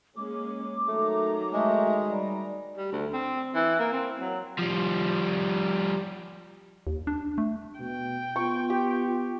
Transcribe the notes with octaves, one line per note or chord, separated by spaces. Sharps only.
G#3 A#3 C#4 D6
D#3 F#3 A3 A#5
G#3 A3
G3
G3
D2
C4
E3
A#3
C4
F#3
F3 G3
D#2
D4
A3
B2 G5
B3 F4 C#6
G4